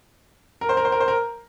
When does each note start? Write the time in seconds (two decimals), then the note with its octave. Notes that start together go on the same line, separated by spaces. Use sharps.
0.61 A#4
0.69 C5
0.77 A#4
0.85 C5
0.92 A#4
1.00 C5
1.08 A#4